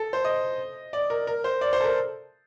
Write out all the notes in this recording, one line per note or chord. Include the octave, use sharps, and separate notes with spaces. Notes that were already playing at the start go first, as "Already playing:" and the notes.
Already playing: A4
C5
D#5
D5
A#4
A#4
C5
D5
C5
A4
A#4